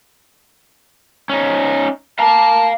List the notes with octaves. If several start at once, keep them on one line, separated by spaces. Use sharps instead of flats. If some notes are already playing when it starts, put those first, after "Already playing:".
C#4 D#4
F5 A5 A#5